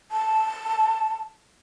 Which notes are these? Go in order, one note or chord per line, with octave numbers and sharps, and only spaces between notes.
A5